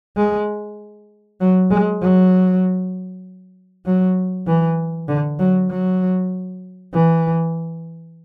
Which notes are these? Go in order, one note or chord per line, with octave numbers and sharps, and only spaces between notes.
G#3
F#3
G#3
F#3
F#3
E3
D3
F#3
F#3
E3